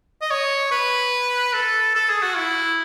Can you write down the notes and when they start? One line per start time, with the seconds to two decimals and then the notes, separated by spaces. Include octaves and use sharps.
0.21 D#5
0.30 C#5
0.71 B4
1.53 A4
1.95 A4
2.09 G#4
2.22 F#4
2.36 E4